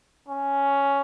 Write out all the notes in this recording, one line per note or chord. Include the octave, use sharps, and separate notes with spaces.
C#4